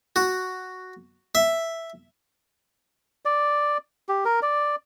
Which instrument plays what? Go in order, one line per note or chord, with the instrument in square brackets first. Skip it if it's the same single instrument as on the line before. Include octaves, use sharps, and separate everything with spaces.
[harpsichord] F#4
E5
[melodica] D5
G4
A#4
D5